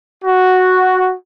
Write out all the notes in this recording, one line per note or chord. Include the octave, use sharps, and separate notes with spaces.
F#4